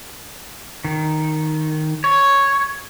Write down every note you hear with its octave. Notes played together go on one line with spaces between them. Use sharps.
D#3
C#5